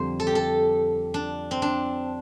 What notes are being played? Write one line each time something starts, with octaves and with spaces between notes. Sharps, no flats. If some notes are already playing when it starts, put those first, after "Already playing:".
Already playing: F2 D3 G3 C5
A4
G4
A4
D4
C4
D4